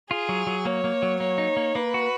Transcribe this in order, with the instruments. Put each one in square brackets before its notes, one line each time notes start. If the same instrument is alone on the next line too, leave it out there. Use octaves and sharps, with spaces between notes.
[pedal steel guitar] F4 [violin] G#4
[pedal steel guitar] F#3
F#3
[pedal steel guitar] A#3 [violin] C#5
[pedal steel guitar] A#3
F#3
[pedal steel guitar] A#3 [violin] C#5
[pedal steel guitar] D#4
A#3
[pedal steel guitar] A#3 [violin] B4
[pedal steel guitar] F#4